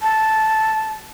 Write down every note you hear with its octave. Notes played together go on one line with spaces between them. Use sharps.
A5